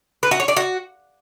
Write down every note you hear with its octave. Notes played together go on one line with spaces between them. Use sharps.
B4
F#4
C#5
D5
F#4